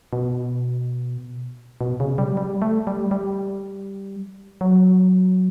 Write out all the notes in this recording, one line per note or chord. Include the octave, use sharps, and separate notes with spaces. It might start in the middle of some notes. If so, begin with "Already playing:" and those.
B2
B2
C#3
G3
G3
A3
G3
G3
F#3